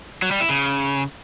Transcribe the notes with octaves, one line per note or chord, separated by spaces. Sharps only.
F#3
G3
E4
C#3